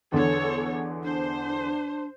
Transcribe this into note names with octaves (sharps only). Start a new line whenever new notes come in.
E2 D3 A4 C#5
D4 C5